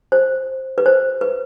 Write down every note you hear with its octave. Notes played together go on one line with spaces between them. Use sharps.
C5
B4
C5
B4